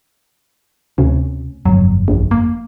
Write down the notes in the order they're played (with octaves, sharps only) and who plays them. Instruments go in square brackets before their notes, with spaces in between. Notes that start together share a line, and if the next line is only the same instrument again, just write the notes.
[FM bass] D2 [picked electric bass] C3 C#4
[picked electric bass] G1 F2 [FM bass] F#3
[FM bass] A#1
A#3